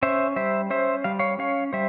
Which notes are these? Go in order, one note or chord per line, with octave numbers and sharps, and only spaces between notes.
C#4 C5 E5
G3 C5 E5
C#4 C5 E5
G3 F5
C#5 F5
C#4 C#5 F5
G3 C5 E5